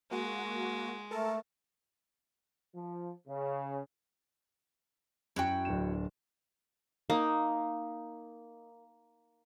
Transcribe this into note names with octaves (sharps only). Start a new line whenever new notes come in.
G#3 A#3 F#4
A3 A4 A#4 A5
F3
C#3
F#2 E4 F#4 G5
D1 D4 E7
A#3 D#4